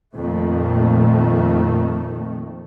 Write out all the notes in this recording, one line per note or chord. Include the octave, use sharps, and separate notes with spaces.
F2 A#2 D#3 A3